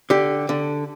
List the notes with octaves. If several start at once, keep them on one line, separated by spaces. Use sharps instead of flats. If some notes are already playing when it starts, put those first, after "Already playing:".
D3 G4
D3